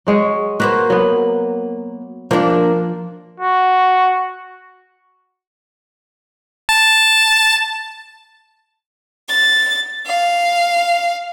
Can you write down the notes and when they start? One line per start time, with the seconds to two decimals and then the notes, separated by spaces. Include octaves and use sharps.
0.07 F#3 G#3 C#5
0.60 A#3 F#4 B4 C5
0.90 F#3 B3
2.31 F3 A#3 D4
3.40 F#4
6.69 A5
9.27 A6
10.06 F5